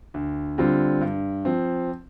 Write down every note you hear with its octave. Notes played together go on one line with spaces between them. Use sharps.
D2
D3 G3 C4 F4
G2
F3 C4